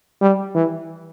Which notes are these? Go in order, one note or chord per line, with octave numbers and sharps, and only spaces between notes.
G3
E3